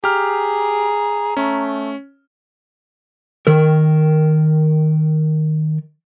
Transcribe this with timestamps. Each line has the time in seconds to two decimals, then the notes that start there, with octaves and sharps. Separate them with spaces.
0.04 G4 G#4 A#5 F6
1.37 A3 C#4
3.47 D#3 A#4